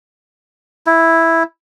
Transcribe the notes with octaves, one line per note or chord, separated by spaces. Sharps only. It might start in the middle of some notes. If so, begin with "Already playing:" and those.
E4